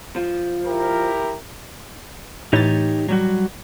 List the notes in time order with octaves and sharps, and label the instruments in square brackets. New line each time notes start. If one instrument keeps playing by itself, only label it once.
[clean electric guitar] F3
[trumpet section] E4 G4 A#4
[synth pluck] A2 E3 A6 [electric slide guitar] D#4 G4 C#5
[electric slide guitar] F#3 G3 F#4